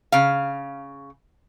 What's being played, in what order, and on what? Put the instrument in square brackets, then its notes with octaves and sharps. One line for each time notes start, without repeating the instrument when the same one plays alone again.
[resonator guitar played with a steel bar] C#3 F5